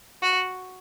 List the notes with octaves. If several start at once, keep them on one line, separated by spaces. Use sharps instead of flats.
F#4